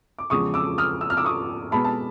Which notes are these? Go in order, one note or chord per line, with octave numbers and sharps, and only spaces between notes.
D6
E2 C#3 F3 G#3 C#6 D#6
D6 E6
D#6 F6
E6
F6
D6 E6
C#6 D#6
B2 G#3 B3 A5 B5
A5